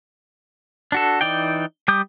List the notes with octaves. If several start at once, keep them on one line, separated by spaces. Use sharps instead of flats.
D4 F#4 A4
E3 D#4 D5 G5
G3 D6 D#6 G6